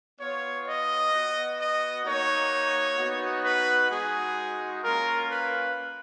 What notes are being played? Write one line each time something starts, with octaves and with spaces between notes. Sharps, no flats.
B3 F4 C#5
D#5
B3 F#4
D#5
A#3 D#4 F#4 C#5
B3 D#4 F#4
B4
G#3 D#4 F#4 G#4
A#3 C#4 F4 A#4
B4